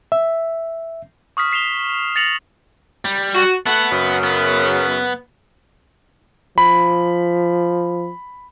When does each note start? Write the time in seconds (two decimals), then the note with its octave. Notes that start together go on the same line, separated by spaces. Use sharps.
0.12 E5
1.37 C#6 D#6 F6 B6
1.52 B6 C7 E7 F7 G7
2.16 A6 A#6 C#7 F7 F#7
3.05 G3
3.35 F#4
3.66 A3 B3 F#5
3.91 F#2 C#3
4.24 B3
6.58 F3 B5